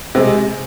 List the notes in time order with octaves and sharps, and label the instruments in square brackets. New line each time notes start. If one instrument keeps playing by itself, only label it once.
[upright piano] C3 G#3